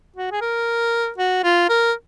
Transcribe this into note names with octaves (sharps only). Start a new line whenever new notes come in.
F#4
G#4
A#4
F#4
F4
A#4